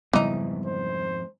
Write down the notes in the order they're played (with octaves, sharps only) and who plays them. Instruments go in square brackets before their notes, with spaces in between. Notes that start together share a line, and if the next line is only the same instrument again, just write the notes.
[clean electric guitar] F2 G#2 [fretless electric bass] C#3 G3 B3 [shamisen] E3 D#4
[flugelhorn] C5